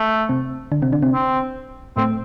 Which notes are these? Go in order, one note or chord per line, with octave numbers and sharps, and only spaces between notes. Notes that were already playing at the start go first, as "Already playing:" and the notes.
Already playing: A3
C3 C4
D3 D4
C3 C4
D3 D4
C3 C4
C4
A2 A3 C4